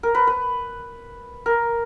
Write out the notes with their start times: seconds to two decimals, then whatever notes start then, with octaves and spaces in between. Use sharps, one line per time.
0.03 A#4
0.15 B4
0.27 B4
1.46 A#4